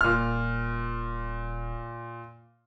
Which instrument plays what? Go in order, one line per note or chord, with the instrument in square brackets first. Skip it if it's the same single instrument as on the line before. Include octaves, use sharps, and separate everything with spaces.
[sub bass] D#1 [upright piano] A#2 F6